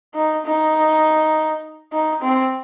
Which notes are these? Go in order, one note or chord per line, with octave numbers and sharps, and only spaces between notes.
D#4
D#4
D#4
C4